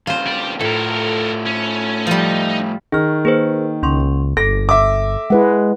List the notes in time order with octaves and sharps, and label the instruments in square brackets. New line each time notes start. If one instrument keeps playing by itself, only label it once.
[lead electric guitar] D#2 C#3 [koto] F4 C5
[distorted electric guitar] G4 D5
[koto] A2 [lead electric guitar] A3 F4 [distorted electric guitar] A4 A#4
[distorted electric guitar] C#4
[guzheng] F3 G3 [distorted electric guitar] D#4
[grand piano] D#3 [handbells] G#4 F6
[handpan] A#3 [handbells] G#4 B4 C5
[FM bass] C#2 [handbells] C#4 C6 C#6
[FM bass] G1 [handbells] A4 [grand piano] A#6
[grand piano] E5 D6
[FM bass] G#3 [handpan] E4 B4 F#5